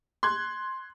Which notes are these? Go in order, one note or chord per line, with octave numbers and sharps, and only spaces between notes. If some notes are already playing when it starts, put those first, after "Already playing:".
C6 F#6 G#6